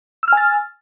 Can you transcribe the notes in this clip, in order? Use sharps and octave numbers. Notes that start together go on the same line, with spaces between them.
G#5 E6 F6 A6